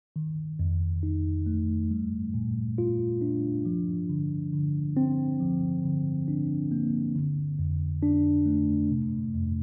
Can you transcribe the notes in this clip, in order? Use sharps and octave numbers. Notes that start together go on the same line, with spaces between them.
D#3
F2
D#4
A3
G3
A#2
F4
D4
F3
D3
D3
C4
F3
D3
D4
A#3
D3
F2
D4
A3
C3
F2